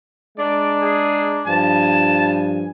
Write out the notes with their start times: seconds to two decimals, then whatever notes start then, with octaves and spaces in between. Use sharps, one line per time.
0.37 G#3 D4 D5 A#5
0.81 G#4
1.46 G2 F3 G#5 A5